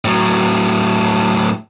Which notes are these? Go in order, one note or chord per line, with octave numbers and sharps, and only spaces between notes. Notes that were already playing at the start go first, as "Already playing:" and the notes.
A2 F#3